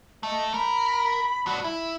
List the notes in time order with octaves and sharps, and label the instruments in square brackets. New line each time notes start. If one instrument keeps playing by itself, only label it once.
[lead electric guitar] A3 [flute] D#5
[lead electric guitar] A#4 [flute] B5
[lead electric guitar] G2 F#4
E4